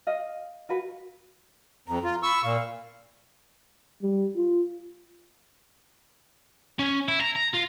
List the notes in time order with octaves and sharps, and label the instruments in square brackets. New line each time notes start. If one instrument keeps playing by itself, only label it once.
[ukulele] D#5 F5
F4 F#4 B4
[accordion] F2 [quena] A#5
[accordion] F4
[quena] B5 [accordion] C#6 E6
[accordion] A#2 [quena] F5
[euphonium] G3
F4
[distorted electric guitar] C#4
E4
A#5
A#5
F4